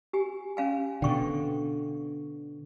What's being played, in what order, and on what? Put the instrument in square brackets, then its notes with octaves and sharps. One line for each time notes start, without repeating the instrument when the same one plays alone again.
[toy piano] G4 G#5
C#4 F5 G#5
[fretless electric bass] B2 D3 [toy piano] G5 C#6